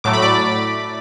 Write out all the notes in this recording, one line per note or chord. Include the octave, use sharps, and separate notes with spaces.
A2 F#3 A3 D6
B5
D5 D6